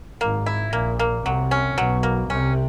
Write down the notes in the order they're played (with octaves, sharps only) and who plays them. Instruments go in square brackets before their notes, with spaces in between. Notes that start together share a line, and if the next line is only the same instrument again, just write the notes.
[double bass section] G#1 G#2 [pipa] A#3
[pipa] E4
[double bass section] A#1 A#2 [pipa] A#3
[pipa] A#3
[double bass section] C2 C3 [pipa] F#3
[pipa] C#4
[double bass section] B1 B2 [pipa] F#3
[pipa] A#3
[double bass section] C2 C3 [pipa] C#4